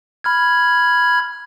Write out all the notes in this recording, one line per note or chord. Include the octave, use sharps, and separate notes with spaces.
B5 F6 G#6